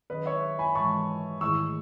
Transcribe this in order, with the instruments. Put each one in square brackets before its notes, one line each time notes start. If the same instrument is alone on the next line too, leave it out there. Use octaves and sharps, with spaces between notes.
[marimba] D#3 F#3 C#4 G#4 [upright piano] B4 D#5
[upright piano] C#5 E5
G#5 B5
[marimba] G#2 E3 G#3 [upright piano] A5 C#6
[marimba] G#2 D#3 A3 E4 G#4 [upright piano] C#6 E6